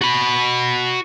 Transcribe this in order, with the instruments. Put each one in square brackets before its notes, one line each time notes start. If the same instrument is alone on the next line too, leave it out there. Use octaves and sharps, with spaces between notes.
[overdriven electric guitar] F#4 B5